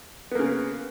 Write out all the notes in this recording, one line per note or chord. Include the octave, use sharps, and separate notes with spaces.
C#3 A#3 B3